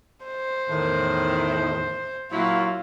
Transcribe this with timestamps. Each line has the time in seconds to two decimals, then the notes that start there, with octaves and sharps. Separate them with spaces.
0.26 C5
0.69 E2 A2 D#3
2.31 A#2 F#3 E4 F4